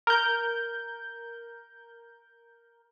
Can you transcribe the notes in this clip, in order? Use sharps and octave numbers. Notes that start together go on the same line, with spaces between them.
A#4 G6